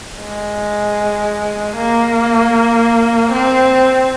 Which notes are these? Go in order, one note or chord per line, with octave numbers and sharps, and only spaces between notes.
G#3
A#3
C4